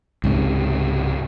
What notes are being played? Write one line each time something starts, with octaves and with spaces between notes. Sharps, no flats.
C#2 G#2 C3